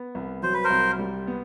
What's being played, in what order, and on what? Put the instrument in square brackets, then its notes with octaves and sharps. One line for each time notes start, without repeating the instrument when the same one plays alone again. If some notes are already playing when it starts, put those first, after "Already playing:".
Already playing: [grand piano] B3
C2
[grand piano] F#3 [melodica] C5
[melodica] B4
A#4 C5
[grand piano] C2
G3
B3